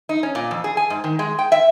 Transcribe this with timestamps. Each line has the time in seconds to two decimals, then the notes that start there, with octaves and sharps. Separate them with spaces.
0.09 D#4
0.23 C#4
0.35 A#2
0.51 F2
0.64 G#4
0.77 G#5
0.90 G#2
1.04 D#3
1.19 G#3
1.39 G5
1.52 E5